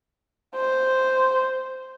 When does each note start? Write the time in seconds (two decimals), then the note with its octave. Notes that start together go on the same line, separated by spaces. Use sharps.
0.56 C5